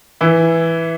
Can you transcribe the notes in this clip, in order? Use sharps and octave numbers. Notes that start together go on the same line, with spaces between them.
E3 E4